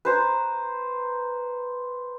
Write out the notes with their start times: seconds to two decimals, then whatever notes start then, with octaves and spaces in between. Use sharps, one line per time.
0.05 B4 C5 A#5